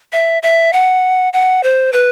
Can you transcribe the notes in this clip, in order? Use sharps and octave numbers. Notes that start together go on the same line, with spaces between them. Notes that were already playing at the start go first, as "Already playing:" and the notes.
E5
E5
F#5
F#5
C5
B4